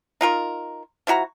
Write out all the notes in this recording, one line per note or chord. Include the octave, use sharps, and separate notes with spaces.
D#4 F4 A#4
F3 E4 F#4 A#5